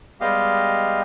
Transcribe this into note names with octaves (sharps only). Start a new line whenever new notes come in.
G3 G#3 B3 G4 D#5 F5